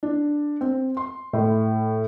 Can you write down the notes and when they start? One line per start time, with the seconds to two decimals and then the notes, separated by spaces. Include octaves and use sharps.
0.03 D4
0.61 C4
0.97 C6
1.33 A2